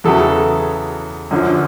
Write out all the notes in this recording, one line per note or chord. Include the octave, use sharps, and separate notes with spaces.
E2 C#3 F#3 A4
F#2 D3 F3